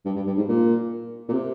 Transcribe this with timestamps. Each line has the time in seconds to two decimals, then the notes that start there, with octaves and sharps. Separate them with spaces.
0.05 G2
0.16 G2
0.27 G2
0.37 G#2
0.49 A#2
1.28 A#2
1.33 C3